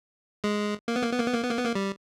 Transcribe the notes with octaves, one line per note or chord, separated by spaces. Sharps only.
G#3
A#3
B3
A#3
B3
A#3
B3
A#3
B3
A#3
B3
A#3
G3